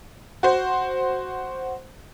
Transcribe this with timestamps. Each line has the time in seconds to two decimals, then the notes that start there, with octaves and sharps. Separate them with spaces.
0.43 F#4 C5